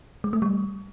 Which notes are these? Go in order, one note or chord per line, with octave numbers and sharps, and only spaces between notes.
G#3
A3
G3